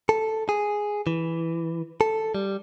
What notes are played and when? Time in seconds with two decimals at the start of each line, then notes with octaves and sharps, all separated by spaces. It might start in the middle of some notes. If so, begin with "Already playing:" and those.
0.09 A4
0.49 G#4
1.07 E3
2.01 A4
2.35 G3